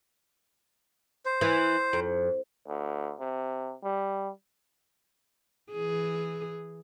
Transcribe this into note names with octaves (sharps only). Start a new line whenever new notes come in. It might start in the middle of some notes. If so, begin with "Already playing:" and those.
C5
E3
F2
D2
C3
G3
E3 G#4